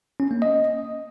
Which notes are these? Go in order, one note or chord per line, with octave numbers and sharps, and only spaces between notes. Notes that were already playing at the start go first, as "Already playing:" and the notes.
C#4
A#3
D#5